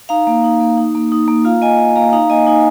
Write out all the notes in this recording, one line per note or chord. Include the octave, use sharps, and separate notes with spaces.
D#4 F5 A#5
A#3
D#4
A#3
D#4
A#3
D#4
A#3
F4 F5 A#5
A#3 D#5 G#5
F4
A#3 F5 A#5
D#4 F5 A#5
A#3 D#5 G#5
D#4 D#5 G#5